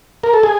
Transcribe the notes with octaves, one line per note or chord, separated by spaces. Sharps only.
A#4
A4
G#4